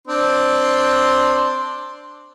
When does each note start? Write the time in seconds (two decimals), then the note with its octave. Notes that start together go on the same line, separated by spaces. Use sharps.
0.08 C4 D4 C6